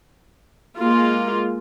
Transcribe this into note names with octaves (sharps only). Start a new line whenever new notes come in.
G#3 A#3 F4